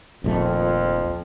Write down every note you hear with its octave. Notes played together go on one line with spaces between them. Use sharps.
D#1 A#1 F2 A3